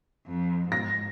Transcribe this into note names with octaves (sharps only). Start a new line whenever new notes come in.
F2
G#2 A#6